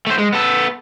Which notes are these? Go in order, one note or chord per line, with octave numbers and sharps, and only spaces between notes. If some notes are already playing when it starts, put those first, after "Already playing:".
A3 C5
G#3
B3 A4